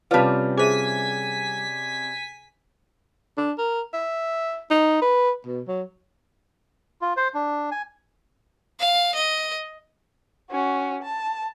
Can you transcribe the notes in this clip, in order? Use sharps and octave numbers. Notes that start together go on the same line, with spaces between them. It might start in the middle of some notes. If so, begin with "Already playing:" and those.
C3 G3 C#4 F4 B4 D5 A5
G#4 C5 E5 G#5 B6
D4
A#4
E5
D#4
B4
B2
F#3
F4
C5
D4
G#5
F5
D#5
C#4 F#4
A5